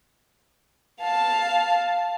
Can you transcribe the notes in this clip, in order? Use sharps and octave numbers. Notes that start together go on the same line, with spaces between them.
F5 A5